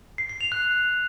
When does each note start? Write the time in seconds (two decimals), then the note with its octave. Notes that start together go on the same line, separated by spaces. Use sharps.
0.18 C7
0.29 C7
0.41 F7
0.52 F#6